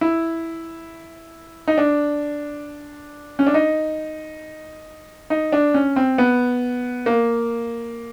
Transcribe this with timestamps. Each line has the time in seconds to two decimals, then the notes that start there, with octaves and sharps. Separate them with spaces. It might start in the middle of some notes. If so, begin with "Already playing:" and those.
0.01 E4
1.68 D#4
1.78 D4
3.39 C#4
3.46 D4
3.54 D#4
5.30 D#4
5.52 D4
5.74 C#4
5.96 C4
6.18 B3
7.06 A#3